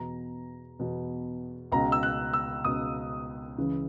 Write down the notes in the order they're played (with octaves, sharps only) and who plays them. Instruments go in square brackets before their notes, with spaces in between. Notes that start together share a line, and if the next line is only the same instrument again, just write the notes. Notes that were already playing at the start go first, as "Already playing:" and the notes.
Already playing: [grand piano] E2 B2 A#5
E2 B2
C#2 B2 A#5
E6
F#6
E6
C#2 B2 D#6
C#2 C#3 E3